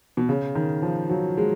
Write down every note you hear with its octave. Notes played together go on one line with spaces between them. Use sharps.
B2
C#3
D#3
F3
F#3
G#3